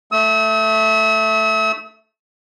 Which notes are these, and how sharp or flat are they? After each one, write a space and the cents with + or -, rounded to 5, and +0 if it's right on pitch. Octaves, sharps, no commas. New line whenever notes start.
A3 +0 E6 -45